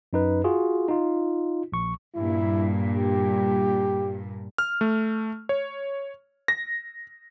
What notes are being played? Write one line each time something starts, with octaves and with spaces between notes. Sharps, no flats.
F#2 D#4 B4
F4 F#4 G#4
D#4 F4
A#1 C#6
G2 A#2 E4
G4
F6
A3
C#5
A#6